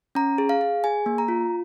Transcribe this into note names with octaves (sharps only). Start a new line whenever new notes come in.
C#4 A#5
G#4
F5
G#4
G#4 G#5
A#3
A#5
F4